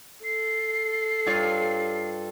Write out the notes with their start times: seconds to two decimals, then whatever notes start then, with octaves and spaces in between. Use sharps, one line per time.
0.24 A4 C7
1.26 G2 F4 C#5